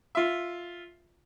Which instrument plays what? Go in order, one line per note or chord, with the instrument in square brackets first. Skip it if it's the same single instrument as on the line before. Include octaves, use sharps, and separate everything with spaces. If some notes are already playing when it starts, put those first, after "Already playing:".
[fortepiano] F4 E5